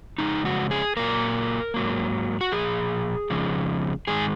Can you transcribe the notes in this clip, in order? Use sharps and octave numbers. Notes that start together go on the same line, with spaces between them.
F2 C#3 G#3 D#4
F#4
G#4
A#2 F#3 A#3 A#4
G#2 F#3 A#3
F#4
A#2 F3 G#4
F2 C#3 F3 G#3
G#2 D#3 G#3 G#4